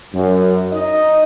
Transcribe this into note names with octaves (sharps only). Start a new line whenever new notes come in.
F#2
D#4 D#5